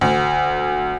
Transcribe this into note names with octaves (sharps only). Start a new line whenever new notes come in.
D2